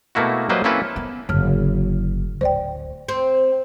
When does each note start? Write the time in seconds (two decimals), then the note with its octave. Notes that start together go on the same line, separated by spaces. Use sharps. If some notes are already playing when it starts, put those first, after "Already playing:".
0.15 B2 A3 A#3 E4 F#4
0.49 F#3 G3 A#3 B4 C5 D#5
0.64 A#3 C4 C#4 E4 A4 B4
0.96 B3
1.29 F#1 G#2 D3 F6
2.41 D1 C5 D5 G5
3.08 C4